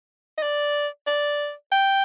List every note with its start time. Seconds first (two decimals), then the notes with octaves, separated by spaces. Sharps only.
0.38 D#5
0.42 D5
1.07 D5
1.72 G5